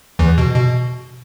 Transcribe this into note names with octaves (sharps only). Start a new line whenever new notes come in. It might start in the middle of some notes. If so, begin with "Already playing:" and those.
E2 E3
B2
B2